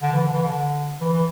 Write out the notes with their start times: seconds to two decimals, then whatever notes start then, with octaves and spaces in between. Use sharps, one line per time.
0.03 D3
0.13 E3
0.23 D3
0.33 E3
0.43 D3
1.01 E3
1.12 E3